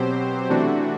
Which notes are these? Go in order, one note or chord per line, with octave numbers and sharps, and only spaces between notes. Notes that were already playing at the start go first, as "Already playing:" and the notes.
Already playing: B2 F#3 C4 G4 C5
C3 E3 A3 D4 F#4